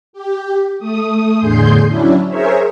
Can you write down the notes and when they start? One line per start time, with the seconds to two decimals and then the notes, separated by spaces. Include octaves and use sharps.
0.13 G4
0.79 A3 D#6
1.39 E2 A2 D3 G#4 C6 G6
1.87 F#3 C#4 D4 E4
2.28 G#4 A#4 C5 C#5 E5